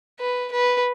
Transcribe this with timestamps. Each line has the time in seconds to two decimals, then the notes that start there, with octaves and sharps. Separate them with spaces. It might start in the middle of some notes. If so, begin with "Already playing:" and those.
0.20 B4
0.52 B4